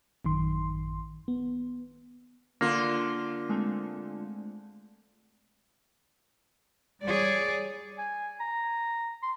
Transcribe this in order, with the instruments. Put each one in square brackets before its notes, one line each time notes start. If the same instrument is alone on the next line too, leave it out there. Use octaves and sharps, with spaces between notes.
[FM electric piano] A1 F#2 D#3 C6
B3
[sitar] D3 F4 [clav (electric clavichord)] A#3
[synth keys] G#3 A3 C4
[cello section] G3 G#4 C#5 [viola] D5
[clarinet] G#5
A#5
C6